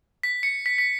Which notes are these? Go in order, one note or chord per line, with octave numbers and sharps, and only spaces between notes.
B6
C#7
B6
B6